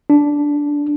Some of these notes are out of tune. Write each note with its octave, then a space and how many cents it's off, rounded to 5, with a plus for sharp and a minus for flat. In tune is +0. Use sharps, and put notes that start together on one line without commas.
D4 -10